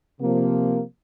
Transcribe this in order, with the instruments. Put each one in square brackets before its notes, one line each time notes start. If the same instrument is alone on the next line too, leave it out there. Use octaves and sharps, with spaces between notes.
[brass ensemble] C3 F3 A#3